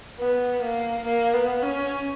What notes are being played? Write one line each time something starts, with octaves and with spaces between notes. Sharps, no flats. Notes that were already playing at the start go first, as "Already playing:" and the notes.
B3
A#3
A#3
B3
C#4